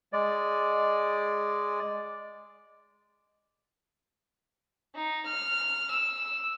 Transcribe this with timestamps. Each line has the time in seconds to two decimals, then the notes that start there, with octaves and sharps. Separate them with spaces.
0.13 G#3 D5
4.95 D#4
5.26 F6
5.91 E6